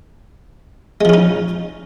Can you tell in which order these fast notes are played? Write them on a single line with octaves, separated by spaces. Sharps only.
G#3 F3 C#4 D#4